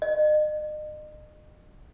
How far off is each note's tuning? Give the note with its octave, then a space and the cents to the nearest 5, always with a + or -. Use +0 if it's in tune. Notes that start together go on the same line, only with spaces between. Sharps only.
D#5 -40